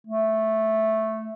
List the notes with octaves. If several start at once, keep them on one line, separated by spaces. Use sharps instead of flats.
A3